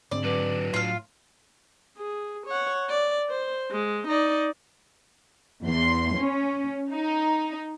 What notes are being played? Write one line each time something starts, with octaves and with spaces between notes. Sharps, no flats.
G#2 D3 C4 D5
F#3 D4 B4
A2 F4 F5
G#4
C#5 F#5
D5
C5
G#3
D#4 D5
E2 C6
C#4
D#4